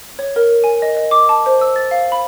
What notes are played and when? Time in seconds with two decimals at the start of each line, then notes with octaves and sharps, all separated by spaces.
0.19 C#5
0.36 A#4
0.64 G#5
0.82 D#5
0.97 D#5
1.11 D6
1.29 A5
1.46 C5
1.61 E6
1.76 A6
1.91 F5
2.12 B5